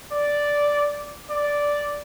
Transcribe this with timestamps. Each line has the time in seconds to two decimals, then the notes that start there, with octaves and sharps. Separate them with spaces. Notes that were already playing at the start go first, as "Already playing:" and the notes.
0.12 D5
1.30 D5